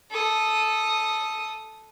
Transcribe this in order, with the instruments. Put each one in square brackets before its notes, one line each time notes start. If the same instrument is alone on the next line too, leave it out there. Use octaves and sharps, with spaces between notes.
[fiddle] A4 D#6